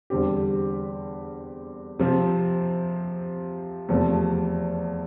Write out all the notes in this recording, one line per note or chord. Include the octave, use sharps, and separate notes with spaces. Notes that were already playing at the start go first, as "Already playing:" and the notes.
E2 D3 G3 C4 G4
C3 F3 C4
E2 C3 F3 A3